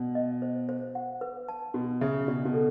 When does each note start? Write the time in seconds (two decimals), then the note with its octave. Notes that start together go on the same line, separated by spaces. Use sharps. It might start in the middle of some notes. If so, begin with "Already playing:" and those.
Already playing: B2 D5
0.15 D#5
0.42 C5
0.69 C5
0.95 F#5
1.21 B4
1.49 A5
1.74 B2 F#4
2.01 C#3 E5
2.28 B2 D5
2.45 B2
2.54 A4